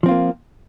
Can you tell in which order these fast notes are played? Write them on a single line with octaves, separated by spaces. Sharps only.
F3 C4 F4 A#3